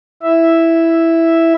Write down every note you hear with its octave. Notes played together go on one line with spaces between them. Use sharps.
E4 E5